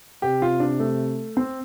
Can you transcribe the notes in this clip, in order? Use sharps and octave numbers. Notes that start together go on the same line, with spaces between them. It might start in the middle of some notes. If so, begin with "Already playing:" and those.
C3 G4
F4
D4
A3
C4